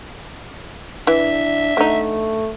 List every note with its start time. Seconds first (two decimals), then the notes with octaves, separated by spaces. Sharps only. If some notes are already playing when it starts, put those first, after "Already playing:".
1.07 E3 D4 E5
1.77 D3 A3 D#4